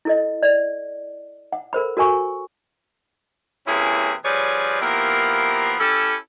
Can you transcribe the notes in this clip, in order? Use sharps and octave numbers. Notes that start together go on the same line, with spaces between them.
E4 A4 D#5
D5
F#5
A4 A#4 C5 B5
F#4 A4 A#4 G#5 C#6
C3 E3 A#3 C#4 E4 G#4
F3 G3 G#4 B4 C#5 D5
F3 A#3 B3 E4 G4 A#4
C#4 E4 G4 A4